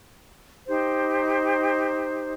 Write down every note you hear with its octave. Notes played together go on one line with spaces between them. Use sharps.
D#4 G4 C5